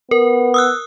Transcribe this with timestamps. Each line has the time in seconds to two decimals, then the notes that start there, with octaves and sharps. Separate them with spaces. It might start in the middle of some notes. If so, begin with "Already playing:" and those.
0.11 B3 A#4
0.54 D#6 E6 F#6